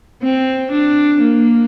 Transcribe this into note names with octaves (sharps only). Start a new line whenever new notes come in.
C4
D4
A#3